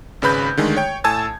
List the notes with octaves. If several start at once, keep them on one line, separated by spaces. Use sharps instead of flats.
G#1 C#3 B4 B5 G6
D3 D#3 G#3 A3
C#5 G5
A2 G#5 A5 E6 G#6